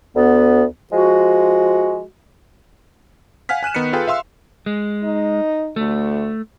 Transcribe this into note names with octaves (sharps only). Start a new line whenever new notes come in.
D2 B3
F3 G#3 F#4
F5 F#5 G#5 F6 B6
G#5 F#6 D#7 E7
D#3 B3 D#4 B6 C#7
F4 G#4 A4 B4 F5 G5
E5 F5 C6 E6
G#3
D#4
D2 A3